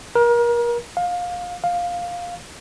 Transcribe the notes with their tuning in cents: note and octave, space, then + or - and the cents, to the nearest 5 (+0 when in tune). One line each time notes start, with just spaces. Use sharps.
A#4 +30
F5 +25
F5 +10